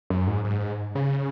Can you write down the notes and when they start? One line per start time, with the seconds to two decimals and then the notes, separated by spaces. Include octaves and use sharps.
0.10 F#2
0.27 G#2
0.44 G#2
0.95 C#3